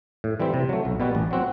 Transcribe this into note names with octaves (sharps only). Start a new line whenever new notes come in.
A2
E3 G3 C4
C3
F#3 A3
B1
B2 G3 B3 F#4
A1
F#3 C4 F#4